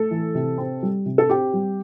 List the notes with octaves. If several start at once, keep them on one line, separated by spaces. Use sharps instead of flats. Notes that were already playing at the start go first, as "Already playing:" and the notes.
Already playing: A3 A4
E3
C3
C4
G3
C3
A4
C4 G4
G3